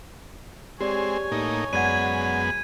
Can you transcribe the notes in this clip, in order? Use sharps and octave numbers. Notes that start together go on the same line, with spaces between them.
G#3 C4 G4 C#5 D5 G#5
A2 A#3 D#4
F#2 G#3 B3 D5 F#5 G#6 D#7